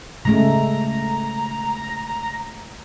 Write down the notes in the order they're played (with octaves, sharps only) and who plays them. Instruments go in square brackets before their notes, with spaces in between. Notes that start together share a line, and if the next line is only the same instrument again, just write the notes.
[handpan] C#3 G#3 A3 [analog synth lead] A#5